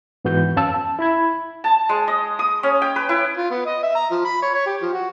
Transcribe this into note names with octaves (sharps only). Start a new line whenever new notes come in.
G#2 E3 B3 F#4 G6
F2 C#4 F5 A5 E6
A5
E4 B5 G#6
A5
G#3
D#5
D#6
C#4
G5
B4
E4
F4
B3
D#5
E5
A#5
F3
B5
C#5
C#5
G4
F3
F#4